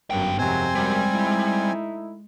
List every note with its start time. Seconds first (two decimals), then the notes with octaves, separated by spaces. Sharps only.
0.11 G1 F#2 D3 F#3 A#3 B3 G5
0.39 F2 C3 D#3 F#3 G#3 C4 C5 G#5
0.75 F#2 G3 G#3
1.13 A3 D#4 E4